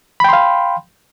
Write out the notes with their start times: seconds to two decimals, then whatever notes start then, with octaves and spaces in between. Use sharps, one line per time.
0.20 B5
0.24 G5
0.29 C6
0.33 F5